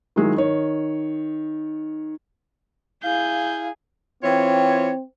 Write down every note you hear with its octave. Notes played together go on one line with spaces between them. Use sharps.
D#3 F#3 G#3 E4
D#3 C#5
E4 G#4 F5 G6
E3 C4 F4 C#5 G5